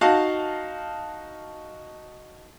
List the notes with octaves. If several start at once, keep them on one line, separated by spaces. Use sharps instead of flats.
D#4 F#4 F5 A5